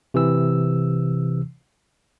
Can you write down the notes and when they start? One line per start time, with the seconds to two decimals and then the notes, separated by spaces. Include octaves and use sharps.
0.14 C3 E3 E6